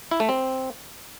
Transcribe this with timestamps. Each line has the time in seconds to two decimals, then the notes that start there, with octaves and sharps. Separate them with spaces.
0.11 E4
0.20 A3
0.29 C4